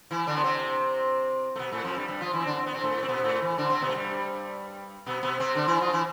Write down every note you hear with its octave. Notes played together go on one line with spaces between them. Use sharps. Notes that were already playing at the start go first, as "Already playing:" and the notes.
E3 E4
D3 D4
B3
C3 C4
A3
B2 B3
A2 A3
F2 F3
G2 G3
G2 G3
F3 F4
E3 E4
C4
D3 D4
C4
B3
C3 C4
A2 A3
C4
B2 B3
A2 A3
E3
D3 D4
C3 C4
B2 B3
A3
G2 G3
B2 B3
B2 B3
C3 C4
D3 D4
E3 E4
F3 F4
E3 E4